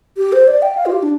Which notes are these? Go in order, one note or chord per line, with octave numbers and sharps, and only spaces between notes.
G4
C5
D5
G5
F5
F4
G4
D4